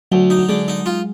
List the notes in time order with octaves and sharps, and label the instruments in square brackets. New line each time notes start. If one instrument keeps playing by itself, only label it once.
[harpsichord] D2 [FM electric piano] F#3
[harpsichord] D#4
[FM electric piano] F#3
[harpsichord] D3 [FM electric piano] G#3
[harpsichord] D#4
F4